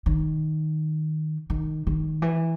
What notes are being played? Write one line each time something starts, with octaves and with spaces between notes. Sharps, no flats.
D#3
D#3
D#3
E3